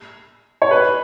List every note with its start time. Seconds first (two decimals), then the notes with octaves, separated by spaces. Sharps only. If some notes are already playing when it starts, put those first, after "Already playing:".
0.62 C#5
0.71 B4